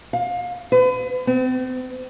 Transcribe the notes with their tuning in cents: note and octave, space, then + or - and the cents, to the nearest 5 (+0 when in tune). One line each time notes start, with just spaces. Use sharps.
F5 +30
B4 +40
C4 -40